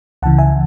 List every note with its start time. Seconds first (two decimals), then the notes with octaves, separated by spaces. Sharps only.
0.22 C#2 C#3 E3 F#5 A5
0.38 E5 G#5